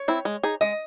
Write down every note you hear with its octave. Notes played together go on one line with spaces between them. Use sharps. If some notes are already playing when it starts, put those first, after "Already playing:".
Already playing: C#5
C4 E4
G#3
D#4 G#4
G#3 D#5